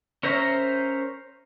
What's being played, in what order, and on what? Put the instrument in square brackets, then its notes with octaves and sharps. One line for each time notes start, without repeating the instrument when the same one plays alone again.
[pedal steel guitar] C#4 A#4 C5 E5 A#5